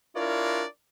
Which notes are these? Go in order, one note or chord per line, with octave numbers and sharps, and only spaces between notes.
D4 E4 F4 A#4 C#5 D5